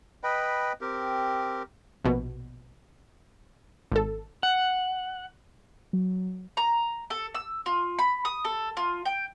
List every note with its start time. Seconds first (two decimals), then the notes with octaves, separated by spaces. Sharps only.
0.24 B4 D#5 G5 B5
0.81 C4 G4 A#4
2.04 A#1 B2
3.92 G#1 A4
4.43 F#5
5.93 F#3
6.57 A#5
7.10 A4
7.35 E6
7.66 F4
7.99 B5
8.25 D#6
8.45 A4
8.77 F4
9.05 G5